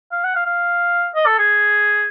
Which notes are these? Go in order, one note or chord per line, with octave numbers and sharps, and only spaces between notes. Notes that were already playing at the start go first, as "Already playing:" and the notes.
F5
F#5
F5
F5
D#5
A4
G#4